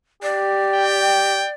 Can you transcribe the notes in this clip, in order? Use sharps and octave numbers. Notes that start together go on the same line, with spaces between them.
G4 D5
G5